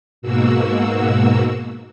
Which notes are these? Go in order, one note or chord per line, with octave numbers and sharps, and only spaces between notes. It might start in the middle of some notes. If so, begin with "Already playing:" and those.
G#2 B2 A#3 F#4 E6